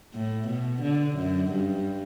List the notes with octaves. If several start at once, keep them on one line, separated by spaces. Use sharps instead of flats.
A2
B2
D3
F#2
G2